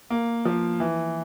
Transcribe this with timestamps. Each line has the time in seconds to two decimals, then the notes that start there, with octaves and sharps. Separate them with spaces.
0.10 A#3
0.45 F3
0.80 E3